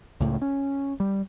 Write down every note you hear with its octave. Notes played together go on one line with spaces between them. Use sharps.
C#2 A2 C#3
C#4
G3